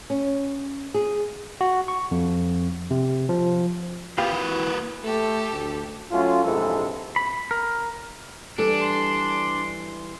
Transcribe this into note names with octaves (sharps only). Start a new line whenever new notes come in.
C#4
G#4
F#4
C#6
F2
C3
F3
A#3 F4 G4 B4 F5
E3 F#4
A3 G4 A4
D2
F#3 A3 C#4 F4
A#1 G#2 C3 E3 G#3 A4
B5
A#4
E3 G3 D4 A4
C6